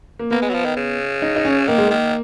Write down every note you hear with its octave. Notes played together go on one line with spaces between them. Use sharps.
A#3
A#3 B3
G#3
F#3
F3
D#3
C#3
D#4
D#4
C#4
D#3 A#3
G#3
D#3 A#3